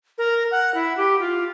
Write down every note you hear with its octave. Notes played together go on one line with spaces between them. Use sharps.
A#4
F#5
E4
G4
F4